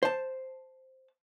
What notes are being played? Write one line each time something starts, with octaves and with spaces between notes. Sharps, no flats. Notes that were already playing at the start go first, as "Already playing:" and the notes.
C5 A5